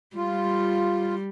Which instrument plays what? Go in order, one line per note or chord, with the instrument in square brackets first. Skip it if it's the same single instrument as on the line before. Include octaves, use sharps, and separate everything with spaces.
[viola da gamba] G3 [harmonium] F4